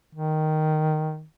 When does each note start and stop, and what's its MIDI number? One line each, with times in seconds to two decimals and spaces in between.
0.15 1.24 51